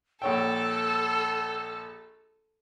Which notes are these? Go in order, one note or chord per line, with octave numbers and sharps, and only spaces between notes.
A#1 A4 C#5 G5 E6